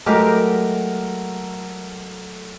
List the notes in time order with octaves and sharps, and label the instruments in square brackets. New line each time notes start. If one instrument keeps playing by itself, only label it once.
[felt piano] F#3 A3 [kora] G#3 G4 [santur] A#4 F#5 A#5